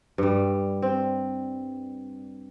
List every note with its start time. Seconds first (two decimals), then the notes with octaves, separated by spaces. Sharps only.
0.18 G2 G3
0.82 C4